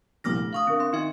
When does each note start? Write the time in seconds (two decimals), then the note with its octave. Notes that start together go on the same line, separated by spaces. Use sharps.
0.24 C2 A#2 F3 D6 F6 A#6
0.39 D2
0.53 F5 C#6 D#6
0.67 D3 C4 A#4
0.79 C4 C6
0.93 D#3 D#4 F4 E5